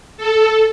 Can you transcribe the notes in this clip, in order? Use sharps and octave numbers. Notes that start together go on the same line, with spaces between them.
A4